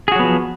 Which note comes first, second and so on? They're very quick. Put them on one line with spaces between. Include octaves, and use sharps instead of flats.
G#4 F#4 F#3 B3 F3